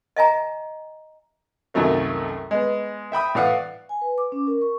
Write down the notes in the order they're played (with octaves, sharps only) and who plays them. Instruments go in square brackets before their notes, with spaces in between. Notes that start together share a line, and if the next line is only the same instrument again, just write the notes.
[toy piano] D#5 E5 G#5 A#5
[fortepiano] C2 F#2 D#3 F#3 A3 A#3
G#3 B3
E5 G5 B5 D#6
A2 E3 D5 F5 F#5 D#6
[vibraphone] G#5
B4
D6
C#4
A#4
C#6